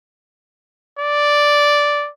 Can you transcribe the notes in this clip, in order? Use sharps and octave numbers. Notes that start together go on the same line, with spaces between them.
D5